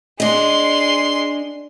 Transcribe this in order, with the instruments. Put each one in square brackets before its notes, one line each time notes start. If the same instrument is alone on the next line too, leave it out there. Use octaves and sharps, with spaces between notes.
[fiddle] G#3 C6 [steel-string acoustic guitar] D4 D#5